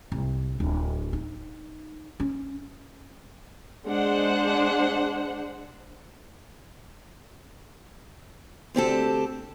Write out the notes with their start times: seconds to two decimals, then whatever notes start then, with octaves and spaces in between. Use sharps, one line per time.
0.12 C2
0.60 D1
1.13 D#4
2.20 C#4
3.87 G#3 D4 C5 F#5
8.75 D2 C4 G4 A4